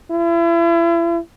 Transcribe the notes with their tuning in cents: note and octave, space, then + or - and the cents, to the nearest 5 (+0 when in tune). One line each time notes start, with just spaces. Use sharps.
E4 +40